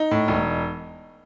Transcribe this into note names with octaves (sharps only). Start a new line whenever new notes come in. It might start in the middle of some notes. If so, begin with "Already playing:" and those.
Already playing: D#4
A2
E1